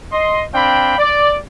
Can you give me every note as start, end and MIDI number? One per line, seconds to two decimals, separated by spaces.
0.13 0.44 75
0.13 0.44 84
0.54 0.98 60
0.54 0.98 62
0.54 0.98 77
0.54 0.98 79
0.54 0.98 83
0.98 1.38 74